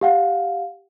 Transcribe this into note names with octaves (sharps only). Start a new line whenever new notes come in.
G4 F5 F#5